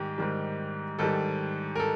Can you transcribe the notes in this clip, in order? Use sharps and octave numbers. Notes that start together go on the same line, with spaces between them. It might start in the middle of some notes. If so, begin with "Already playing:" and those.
Already playing: G#2 D#3 G3 G4
G#2 D#3 G3
G#2 D#3 G3 A4
A#4
A4